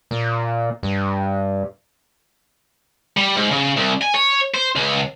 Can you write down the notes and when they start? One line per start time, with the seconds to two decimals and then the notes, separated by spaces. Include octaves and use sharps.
0.11 A#2
0.83 G2
3.17 G3
3.37 G#2
3.52 C#3
3.77 C2
4.02 G#5
4.15 C#5
4.54 C5
4.75 C#2